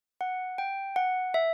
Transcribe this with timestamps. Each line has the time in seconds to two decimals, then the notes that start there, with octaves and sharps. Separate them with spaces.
0.21 F#5
0.58 G5
0.96 F#5
1.34 E5